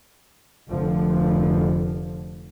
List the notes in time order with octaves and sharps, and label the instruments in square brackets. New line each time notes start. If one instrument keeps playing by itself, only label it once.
[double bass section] F1 F2 D3 F3